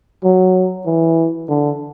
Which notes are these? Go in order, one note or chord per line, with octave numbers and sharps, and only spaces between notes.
F#3
E3
D3